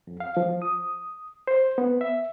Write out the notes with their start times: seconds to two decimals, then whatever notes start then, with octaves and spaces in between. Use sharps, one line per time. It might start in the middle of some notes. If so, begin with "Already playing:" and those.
0.07 F2
0.20 F5
0.37 F3
0.62 D#6
1.47 C5
1.78 B3
2.01 E5